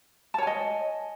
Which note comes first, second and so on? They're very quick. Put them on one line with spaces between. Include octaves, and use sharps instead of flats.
A5 C#5 G#5 D#5